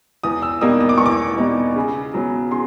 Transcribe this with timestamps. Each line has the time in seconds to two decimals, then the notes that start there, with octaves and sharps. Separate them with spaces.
0.24 E2 D#6
0.42 E6
0.61 B2 G3 A#3 D#4 D#6
0.81 D#6
0.89 D6
0.98 E2 C#6
1.06 D6
1.38 B2 G3 A#3 D#4
1.76 C#3
2.14 F#3 B3
2.51 C#3 C6